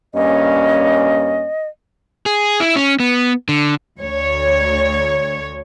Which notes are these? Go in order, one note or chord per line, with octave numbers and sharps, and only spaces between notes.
G2 A#3 C#4 D#5
G#4
E4
C#4
B3
D3
D2 C#5